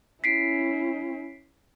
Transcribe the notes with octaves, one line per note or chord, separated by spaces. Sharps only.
C#4 E4 B6 C7 D7